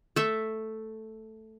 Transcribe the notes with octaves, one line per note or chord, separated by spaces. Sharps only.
A3 E5